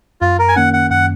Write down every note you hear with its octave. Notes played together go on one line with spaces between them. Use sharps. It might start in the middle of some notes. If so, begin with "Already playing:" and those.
F#2 F4
A#4
G#5
D#3 A#3 C#4 F#5
F#5
F#2 F#5